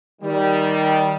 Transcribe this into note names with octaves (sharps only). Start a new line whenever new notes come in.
D#3 G3